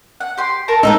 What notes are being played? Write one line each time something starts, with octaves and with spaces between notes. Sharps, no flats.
F#5
G4 C6
A#4 A5 A#5
G#3 A#3 D#4 E6